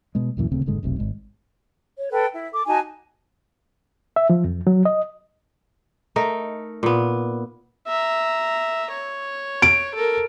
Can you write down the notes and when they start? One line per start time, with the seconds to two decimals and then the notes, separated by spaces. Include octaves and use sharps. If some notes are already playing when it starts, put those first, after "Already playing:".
0.15 B2 G#3
0.37 C#2 F#2 A#2 E3
0.52 D#1 D2 C#3 C4
0.66 F#1 G#2 D3 G#3
0.83 F1 B1 C3
0.99 G#1 G#3
1.98 C#5
2.11 A4 B4 G5
2.34 E4
2.52 A4 D6
2.66 D#4 F#4 G#5 A5
4.16 E5
4.30 F3
4.45 F2
4.67 F#3
4.85 D#5
6.16 A3 D#4 A#4
6.83 A#2 B3
7.87 E5 A#5
8.91 C#5
9.62 D7
9.94 A4 A#4